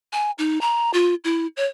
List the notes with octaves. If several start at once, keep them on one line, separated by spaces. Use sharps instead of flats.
G#5
D#4
A#5
F4
E4
C#5